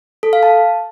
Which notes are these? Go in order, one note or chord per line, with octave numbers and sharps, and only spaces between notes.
A4
F5
A5